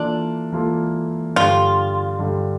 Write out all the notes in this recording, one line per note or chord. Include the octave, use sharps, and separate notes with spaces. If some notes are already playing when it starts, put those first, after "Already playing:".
Already playing: E3 A#3 D4 F4 A4
E3 A#3 F4 A4
G2 D3 G3 F4
G2 D3 G3